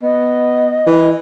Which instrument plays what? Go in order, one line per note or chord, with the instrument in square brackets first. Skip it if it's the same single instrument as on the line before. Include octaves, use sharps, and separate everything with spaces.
[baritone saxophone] B3 [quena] D#5
[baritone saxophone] E3